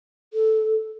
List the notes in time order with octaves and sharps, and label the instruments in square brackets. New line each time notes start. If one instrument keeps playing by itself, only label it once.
[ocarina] A4